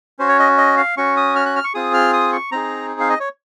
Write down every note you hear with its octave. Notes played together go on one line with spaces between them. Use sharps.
C#4 F#4 C5
C#5
D#5
D#5
F5
C#4 F#4 C#6
D#6
F6
F#6
F6
C#6
C4 F4 G#4 D#6
F6
D#6
C#6
C4 D#4 G#4 A#5
F5
D#5
C#5